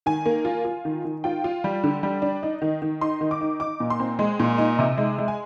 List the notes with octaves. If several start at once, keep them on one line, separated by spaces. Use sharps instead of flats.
D#3 G#5
A#3
F4
F4
D#3
D#3
F4 G5
F4
G3
D3
G3
D4
D#4
D#3
D#3
D#4 C6
D#3
D6
D#4
D#4 D6
A#2
C6
C4
G#3
A#2
D#4
C3
G#3
G#3
G#5